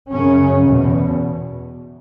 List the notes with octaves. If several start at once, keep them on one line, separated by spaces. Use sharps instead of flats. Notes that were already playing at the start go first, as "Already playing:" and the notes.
F#2 C#3 C#4
E2 B2